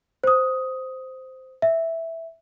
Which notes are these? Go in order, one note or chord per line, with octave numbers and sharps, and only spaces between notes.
C5 D#6
E5